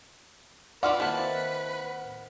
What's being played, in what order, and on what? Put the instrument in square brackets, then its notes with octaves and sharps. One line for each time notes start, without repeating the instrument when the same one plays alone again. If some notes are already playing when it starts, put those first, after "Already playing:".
[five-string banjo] F4 F#4 D5 [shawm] B4 [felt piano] F#5 F6
[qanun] D#3 A#3 C4 [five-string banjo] E4 A5